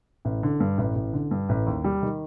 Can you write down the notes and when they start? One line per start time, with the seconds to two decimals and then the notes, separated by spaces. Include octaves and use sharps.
0.25 A1
0.43 D3
0.60 G2
0.78 A1
0.96 A1
1.13 D3
1.31 G2
1.49 A1
1.66 D#2
1.84 G3
2.02 D#3